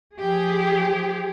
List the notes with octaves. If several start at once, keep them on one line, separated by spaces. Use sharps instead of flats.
F3 G4 G#4